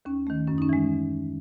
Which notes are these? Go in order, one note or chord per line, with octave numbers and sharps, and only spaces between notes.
D#2 C#4
D#3 A3
F#2 C#4
D#4
C#4
E3 G#3